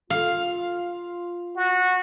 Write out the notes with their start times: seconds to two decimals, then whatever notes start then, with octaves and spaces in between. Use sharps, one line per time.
0.10 F4 F5
1.56 F#4